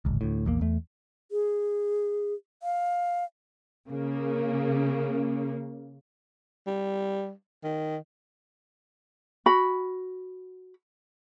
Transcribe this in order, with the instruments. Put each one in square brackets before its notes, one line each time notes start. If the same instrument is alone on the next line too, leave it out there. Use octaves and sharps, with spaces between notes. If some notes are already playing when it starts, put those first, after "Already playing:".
[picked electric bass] D1 G#1 C#2
D2 A2
A#1 E2 E3 A#3
E2 A3
[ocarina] G#4
F5
[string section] C#3 A#3
[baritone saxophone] G3
D#3
[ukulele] F#4 B5